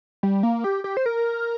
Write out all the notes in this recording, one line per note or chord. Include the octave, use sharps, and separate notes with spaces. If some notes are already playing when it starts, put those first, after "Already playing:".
G3
A#3
G4
G4
C5
A#4